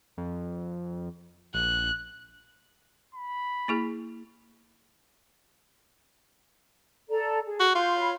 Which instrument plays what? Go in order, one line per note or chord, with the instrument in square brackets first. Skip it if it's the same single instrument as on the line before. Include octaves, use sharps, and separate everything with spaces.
[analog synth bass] F2
[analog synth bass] A#1 [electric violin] F#6
[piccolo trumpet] B5
[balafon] A#3 E4 G#4
[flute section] A4 D5 A#5
G#4
[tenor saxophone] F#4
[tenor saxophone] F4 [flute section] C6 G6
[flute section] C#5 F5 B5